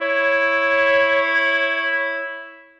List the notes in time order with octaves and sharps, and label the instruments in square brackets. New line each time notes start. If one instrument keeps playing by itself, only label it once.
[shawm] E4 [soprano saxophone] C#5